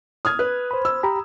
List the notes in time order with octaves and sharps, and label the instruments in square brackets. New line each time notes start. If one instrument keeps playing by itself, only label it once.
[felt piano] D#6 F6 G#6
[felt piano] B4 [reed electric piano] F#6
[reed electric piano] C5 B5
[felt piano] E6
[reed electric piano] G4 A#5 B5